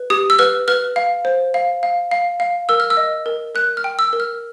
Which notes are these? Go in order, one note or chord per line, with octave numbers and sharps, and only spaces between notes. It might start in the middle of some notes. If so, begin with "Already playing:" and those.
Already playing: B4
G4 D#6
E6
B4 F6
B4 F6
F5
C5
F5
F5
F5
F5
A#4 E6
F6
E6
D#5
A#4
A#4 F#6
F6
G5
E6
A#4
F6